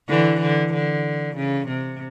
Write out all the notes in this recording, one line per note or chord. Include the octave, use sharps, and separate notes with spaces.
D3 E3
D3
D3
C#3
C3